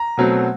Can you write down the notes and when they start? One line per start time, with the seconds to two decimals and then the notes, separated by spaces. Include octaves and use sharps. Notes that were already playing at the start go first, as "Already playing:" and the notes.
Already playing: A#5
0.17 B2 F#3 A3 C4